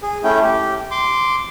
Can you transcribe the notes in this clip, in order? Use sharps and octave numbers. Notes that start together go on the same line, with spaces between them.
G#4
A3 C#4 E4 G5
G4
C6 D6